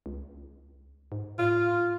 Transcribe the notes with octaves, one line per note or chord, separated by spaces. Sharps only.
C#2
G#2
A2 F4